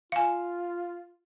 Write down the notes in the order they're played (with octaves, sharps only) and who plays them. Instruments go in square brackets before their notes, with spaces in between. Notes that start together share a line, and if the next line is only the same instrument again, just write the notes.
[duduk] F4 [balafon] F5 G#5